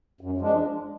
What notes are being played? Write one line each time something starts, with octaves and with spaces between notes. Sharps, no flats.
F#2
F3 G#3 D4